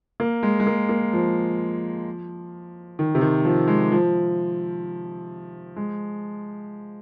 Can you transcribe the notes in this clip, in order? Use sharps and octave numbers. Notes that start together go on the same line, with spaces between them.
A#3
G#3
G#3
A#3
A#3
F3
D#3
C3
D#3
F3
G#3
F3
G#3